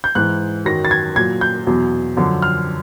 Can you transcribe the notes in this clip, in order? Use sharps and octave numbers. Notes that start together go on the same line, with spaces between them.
G6
G#2 E3 F#6
F#2 D#3 F#3 A#6
A6
G#6
A#2 F#3 G#6
G6
E2 B2 F#3
F#2 D3 F3
F6